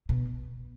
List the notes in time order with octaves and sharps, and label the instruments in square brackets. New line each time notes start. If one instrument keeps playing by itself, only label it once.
[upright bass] B2